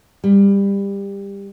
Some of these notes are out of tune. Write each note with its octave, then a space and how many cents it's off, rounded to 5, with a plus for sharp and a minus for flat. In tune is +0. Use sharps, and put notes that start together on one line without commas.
G3 +20